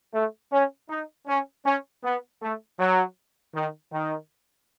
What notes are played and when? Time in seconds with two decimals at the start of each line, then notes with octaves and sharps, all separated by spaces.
0.14 A3
0.51 C#4
0.89 D#4
1.27 C#4
1.65 C#4
2.03 B3
2.41 A3
2.79 F#3
3.54 D#3
3.92 D#3